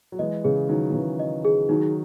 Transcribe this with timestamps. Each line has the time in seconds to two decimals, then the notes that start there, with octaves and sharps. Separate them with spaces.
0.12 F#3
0.19 E3 G#3 D#5
0.44 C#3 E3 G#4
0.69 D#3 F#3 D#4
0.90 D#3
0.94 C#3 E3 D#4
1.19 D#5
1.44 G#4
1.69 D#3 F#3 D#4